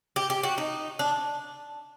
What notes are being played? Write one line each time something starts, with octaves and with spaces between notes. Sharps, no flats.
G4
G4
F#4
D#4
D4